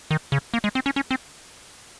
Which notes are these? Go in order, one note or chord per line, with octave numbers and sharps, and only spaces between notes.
D#3
C#3
A#3
G#3
C4
C#4
C#4
C4